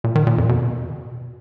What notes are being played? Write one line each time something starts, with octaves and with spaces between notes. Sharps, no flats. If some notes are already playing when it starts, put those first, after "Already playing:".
A#2
D#3
A#2
F2
B2